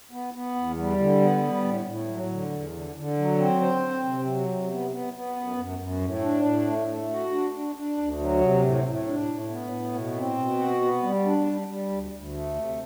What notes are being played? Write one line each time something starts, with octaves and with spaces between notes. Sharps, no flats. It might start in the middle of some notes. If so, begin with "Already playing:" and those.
B3
B3
E2
G3
D3
B3
G3
A2
A2
F#3
D3
E2
D3
D3
F#3
C4
C5
C4
C3
F#3
C3
B3
B3
B3
F#2
F#2
F#2
A2
D4
A2
A3
A3
F#4
D4
D4
D4
D2
F#3
C3
A2
A2
D4
A2
B3
A2
B2
C4
B2
F#4
B3
G3
D4
G3
G3
D2
D2
A3
C3